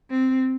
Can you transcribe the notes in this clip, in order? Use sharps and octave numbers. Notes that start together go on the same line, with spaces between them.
C4